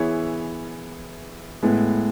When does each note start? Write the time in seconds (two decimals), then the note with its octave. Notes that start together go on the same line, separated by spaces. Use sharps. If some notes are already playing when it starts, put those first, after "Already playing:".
Already playing: E3 B3 E4 G#4 C#5
1.63 A2 G#3 B3